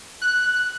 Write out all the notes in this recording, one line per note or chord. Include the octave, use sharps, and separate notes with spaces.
F#6